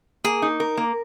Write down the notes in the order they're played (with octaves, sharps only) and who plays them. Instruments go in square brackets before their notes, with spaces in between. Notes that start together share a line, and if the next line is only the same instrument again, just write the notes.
[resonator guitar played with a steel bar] A#3 [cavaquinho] G#4
[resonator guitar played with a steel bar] D#4
A#4
A#3